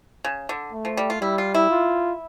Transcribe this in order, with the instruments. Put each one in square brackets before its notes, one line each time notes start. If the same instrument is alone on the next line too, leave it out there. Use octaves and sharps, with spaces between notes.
[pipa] C#3
D3
[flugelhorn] A3
[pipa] F3
G3
F4
[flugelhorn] G3 [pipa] E4
[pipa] F4
E4
[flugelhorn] F4